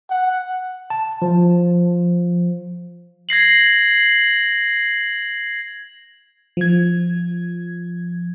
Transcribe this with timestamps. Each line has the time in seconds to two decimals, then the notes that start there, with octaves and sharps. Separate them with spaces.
0.10 F#5
0.90 A5
1.22 F3
3.29 G#6 A#6 C7 F#7
6.57 F3 G#6